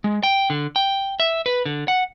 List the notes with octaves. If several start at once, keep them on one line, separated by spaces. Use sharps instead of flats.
G#3
G5
D3
G5
E5
B4
D3
F#5